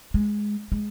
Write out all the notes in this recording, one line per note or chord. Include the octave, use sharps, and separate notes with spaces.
G#3
G#3